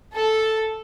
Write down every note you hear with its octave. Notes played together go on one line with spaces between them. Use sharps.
A4